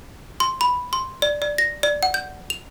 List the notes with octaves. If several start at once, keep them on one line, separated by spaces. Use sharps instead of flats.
C6
B5
C6
D5
D5
A#6
D5
F#5
G6
F7